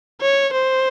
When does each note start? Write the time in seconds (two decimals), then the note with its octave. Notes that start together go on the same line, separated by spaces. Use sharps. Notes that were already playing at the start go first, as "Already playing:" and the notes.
0.21 C#5
0.53 C5